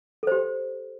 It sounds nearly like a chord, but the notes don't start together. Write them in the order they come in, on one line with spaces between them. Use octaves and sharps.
A4 C5 G4